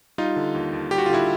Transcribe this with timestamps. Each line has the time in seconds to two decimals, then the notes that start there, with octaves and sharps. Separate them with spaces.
0.18 G3 D#4 F4
0.36 D3
0.55 D#2
0.73 D#2
0.91 G3 G4
0.98 F#4
1.06 F4
1.09 D3 E4 F#4